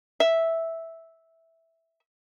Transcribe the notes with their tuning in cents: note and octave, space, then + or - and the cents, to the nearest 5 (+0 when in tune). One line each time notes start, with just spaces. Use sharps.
E5 -5